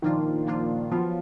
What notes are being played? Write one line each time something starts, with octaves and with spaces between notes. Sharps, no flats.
A#2 D#3 F3 A#3 D4 F4
A#2 F3 A#3 D4 F4
F3 F#3 B3 F4